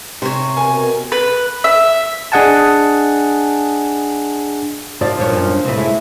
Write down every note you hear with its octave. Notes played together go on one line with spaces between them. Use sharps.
C3 C5 C#5
B2 A#4 G#5
B4
E5
D4 G#4 D#5 F#5 G#5 A5
G#2 F3 D5
B1 G2 A#2 C#5
F#2
C2 A2 C4 B4
G#3 E4